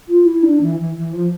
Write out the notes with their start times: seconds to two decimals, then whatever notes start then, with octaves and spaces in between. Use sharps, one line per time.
0.08 F4
0.25 E4
0.43 D4
0.60 E3
0.77 E3
0.95 E3
1.12 F3